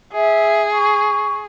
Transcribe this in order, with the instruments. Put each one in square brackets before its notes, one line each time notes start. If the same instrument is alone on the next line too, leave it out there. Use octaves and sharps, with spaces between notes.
[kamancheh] G#4 [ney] E5
[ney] C#6